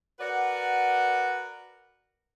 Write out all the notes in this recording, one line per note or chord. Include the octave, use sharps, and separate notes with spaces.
F#4 A#4 B4 D5 F#5